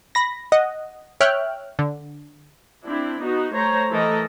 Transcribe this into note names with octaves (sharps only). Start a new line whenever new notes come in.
B5 A#6
D#5 F#5
C#5 E5 G5 F6 F#6
D3
C4 D4 E4
B3 D#4 F#4
A3 C5 C#5 A#5
E3 A3 A4 A#4 D#5